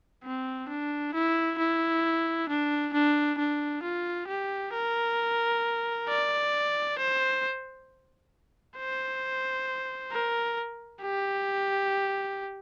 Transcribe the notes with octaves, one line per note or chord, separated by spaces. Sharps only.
C4
D4
E4
E4
D4
D4
D4
F4
G4
A#4
D5
C5
C5
A#4
G4